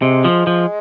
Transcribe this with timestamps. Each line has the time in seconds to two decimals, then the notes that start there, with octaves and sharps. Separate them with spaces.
0.02 C3 G#3
0.25 F3
0.47 F3